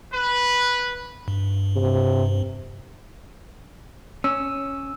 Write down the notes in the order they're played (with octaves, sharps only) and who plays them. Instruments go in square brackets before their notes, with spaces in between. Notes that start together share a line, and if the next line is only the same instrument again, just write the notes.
[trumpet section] B4
[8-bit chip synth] G2
[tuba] C3
[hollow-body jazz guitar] C#4 [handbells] E6